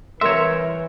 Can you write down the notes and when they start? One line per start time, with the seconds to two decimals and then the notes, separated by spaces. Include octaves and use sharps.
0.21 C2 E3 A#4 C#5 E5 C6